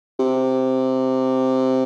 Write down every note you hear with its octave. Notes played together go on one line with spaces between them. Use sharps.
C3